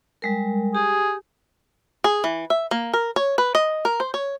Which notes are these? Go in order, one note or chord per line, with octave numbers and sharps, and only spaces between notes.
G3 G#3 A#4
G4 G#4
G#4
E3
E5
A#3
A#4
C#5
B4
D#5
A#4
C5
C#5